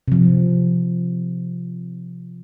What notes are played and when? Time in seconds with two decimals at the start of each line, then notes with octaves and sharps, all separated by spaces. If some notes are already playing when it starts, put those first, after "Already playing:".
0.08 C3 F3